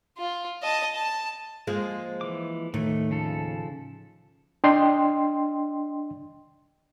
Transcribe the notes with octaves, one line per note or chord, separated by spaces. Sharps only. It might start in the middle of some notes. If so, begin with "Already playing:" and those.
F4
D#5 A5
A5
F3 G#3 A#3
E3 D6
D#2 A2 D#3 A3
C#3 F3 A4
D4 D#5 G5 C6